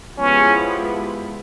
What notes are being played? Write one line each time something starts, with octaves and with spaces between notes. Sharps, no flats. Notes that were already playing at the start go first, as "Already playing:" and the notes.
F3 G#3 B3 C#4 E4 G4